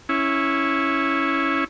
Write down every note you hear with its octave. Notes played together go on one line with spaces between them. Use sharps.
C#4 E4